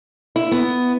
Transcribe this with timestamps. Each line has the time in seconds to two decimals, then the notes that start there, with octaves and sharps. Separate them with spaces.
0.36 E4
0.51 B3